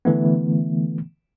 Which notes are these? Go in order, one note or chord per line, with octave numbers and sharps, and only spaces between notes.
D3 E3 A3 B3